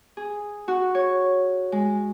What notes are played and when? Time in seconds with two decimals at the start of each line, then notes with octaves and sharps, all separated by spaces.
0.17 G#4
0.68 F#4
0.95 C#5
1.72 G#3